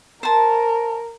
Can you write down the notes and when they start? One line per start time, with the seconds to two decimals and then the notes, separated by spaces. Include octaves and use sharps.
0.23 A#4 C5 A5